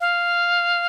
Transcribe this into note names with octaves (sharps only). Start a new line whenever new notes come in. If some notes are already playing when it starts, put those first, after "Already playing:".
F5